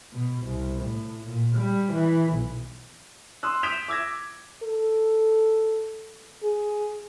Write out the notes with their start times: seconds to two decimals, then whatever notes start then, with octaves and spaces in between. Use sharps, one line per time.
0.13 B2
0.45 C2
0.85 A2
1.26 A#2
1.57 G3
1.93 E3
2.33 B1
3.43 C6 D#6 E6 F#6
3.63 D#6 G6 B6 D7 E7 F7
3.88 D6 E6 G#6 A#6
4.63 A4
6.43 G#4